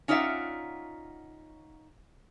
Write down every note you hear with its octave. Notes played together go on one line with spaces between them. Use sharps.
C#4 D#4 F4 D5 E5 F#5